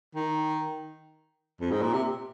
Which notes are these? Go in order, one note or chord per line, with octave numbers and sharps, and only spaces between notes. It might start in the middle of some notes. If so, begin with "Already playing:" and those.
D#3
F2
G#2
A#2
C3